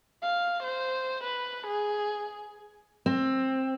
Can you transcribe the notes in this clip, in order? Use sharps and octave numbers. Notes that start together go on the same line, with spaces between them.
F5
C5
B4
G#4
C4